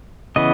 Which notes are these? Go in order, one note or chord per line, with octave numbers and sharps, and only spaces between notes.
C#3 E3 B3 D#5